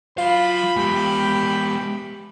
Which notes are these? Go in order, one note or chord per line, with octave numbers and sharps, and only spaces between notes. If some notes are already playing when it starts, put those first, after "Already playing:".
F#3 F4 F5 B5
G#3 B3 G4